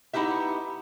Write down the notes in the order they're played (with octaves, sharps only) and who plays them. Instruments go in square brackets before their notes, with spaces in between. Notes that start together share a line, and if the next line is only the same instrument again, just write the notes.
[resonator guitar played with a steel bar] B3 D#4 E4 G4 E5